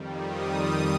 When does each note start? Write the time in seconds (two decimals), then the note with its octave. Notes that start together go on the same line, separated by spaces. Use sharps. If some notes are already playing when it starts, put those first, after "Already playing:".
Already playing: F2 D#3 G3
0.29 D#6